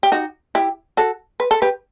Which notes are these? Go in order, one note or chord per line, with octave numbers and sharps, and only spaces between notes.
G4
D#4 F#4
E4 G4
F#4 A4
B4
A4
G4 B4